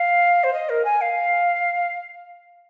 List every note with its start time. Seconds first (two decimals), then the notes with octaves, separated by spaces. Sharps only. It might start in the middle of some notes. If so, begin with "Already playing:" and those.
Already playing: F5
0.44 C5
0.53 D#5
0.70 A#4
0.85 G#5
1.01 F5